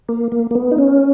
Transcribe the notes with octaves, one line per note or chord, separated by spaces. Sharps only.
A#3
A#3
A#3
B3
D#4
C#4